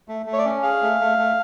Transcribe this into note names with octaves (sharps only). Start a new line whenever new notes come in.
A3
A3
C#5
D5
C#4
G#4 F5
A3
A3
A3